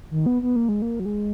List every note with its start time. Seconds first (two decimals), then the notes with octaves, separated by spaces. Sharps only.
0.11 D#3
0.26 B3
0.42 B3
0.56 A#3
0.69 G#3
0.82 A#3
1.00 F#3
1.05 G#3